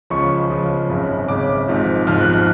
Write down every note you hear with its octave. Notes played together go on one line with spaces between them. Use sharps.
C#2 C#3 F3 C#6
C#2 C#3 F3
G#1 F#2 C#3
G#1 F#2 C#3 D6
G#1 G#2 F3
G#1 G#2 F3 F6
F#6
F#6